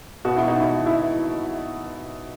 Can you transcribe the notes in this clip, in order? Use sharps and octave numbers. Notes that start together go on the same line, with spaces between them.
B2 F#4
E4
D#4
E4
E4